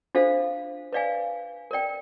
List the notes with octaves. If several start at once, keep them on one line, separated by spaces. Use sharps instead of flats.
D4 F4 A4 C5 F5
B4 D5 F5 G#5
A#4 D5 G5